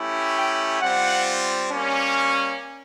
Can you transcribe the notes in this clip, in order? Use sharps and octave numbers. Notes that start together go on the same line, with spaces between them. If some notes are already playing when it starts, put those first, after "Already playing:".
Already playing: A3 C#4 E4 G4
G5
G3 C4 F4 F#5
G3 A#3 C#4